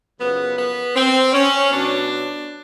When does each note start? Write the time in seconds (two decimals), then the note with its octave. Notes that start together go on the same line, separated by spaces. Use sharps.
0.19 F#2 C#3 F3 B3
0.57 B3
0.95 C4
1.33 C#4
1.71 B2 F#3 D4